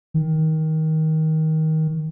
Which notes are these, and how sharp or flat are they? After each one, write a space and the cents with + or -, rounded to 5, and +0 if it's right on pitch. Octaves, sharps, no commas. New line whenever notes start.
D#3 +20